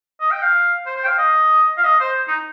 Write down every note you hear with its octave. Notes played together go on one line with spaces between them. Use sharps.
D#5
G5
F5
C5
C5
G5
F5
D#5
F5
D#5
C5
D#4